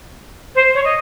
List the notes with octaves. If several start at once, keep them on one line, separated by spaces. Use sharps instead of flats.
C5
C#5
D#5